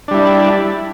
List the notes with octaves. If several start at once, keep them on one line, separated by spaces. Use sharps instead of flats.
G3 D4 E4